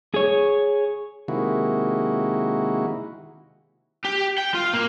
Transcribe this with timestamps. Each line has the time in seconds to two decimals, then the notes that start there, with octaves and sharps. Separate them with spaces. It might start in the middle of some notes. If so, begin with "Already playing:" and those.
0.14 G#4 C#5
1.28 C3 D#3 G#3 A#3 E4 F#4
4.04 G4
4.38 G5
4.54 F4
4.73 A#3